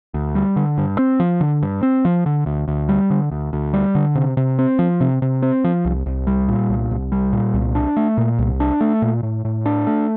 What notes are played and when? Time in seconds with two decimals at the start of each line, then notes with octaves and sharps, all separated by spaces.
0.14 D2
0.35 G3
0.56 D3
0.78 G2
0.99 C4
1.20 F3
1.41 D3
1.63 G2
1.83 C4
2.05 F3
2.26 D3
2.46 D2
2.68 D2
2.89 G3
3.10 D3
3.31 D2
3.53 D2
3.74 G3
3.95 D3
4.15 C3
4.37 C3
4.59 C4
4.79 F3
5.01 C3
5.22 C3
5.42 C4
5.64 F3
5.85 C2
6.06 C2
6.27 G3
6.49 A#2
6.69 C2
6.91 C2
7.12 G3
7.33 A#2
7.54 C2
7.75 D4
7.97 A3
8.18 A#2
8.39 C2
8.60 D4
8.81 A3
9.02 A#2
9.23 A2
9.45 A2
9.66 D4
9.87 A3